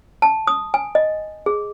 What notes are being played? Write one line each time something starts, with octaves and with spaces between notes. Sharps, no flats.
A5
D#6
G#5
D#5
G#4